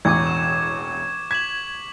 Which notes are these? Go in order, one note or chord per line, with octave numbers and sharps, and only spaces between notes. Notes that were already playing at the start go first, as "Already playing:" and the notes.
E1 A1 E2 C#6 D6 G#6
E7
G#6 B6 E7 F#7